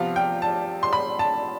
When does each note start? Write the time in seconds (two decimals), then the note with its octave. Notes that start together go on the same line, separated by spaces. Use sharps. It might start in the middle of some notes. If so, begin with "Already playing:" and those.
Already playing: C3 F3 B3 F5
0.16 G5
0.42 A5
0.83 C6
0.93 B5
1.19 A5